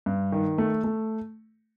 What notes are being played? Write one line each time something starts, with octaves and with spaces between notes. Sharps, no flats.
G2
D#3
A3
A3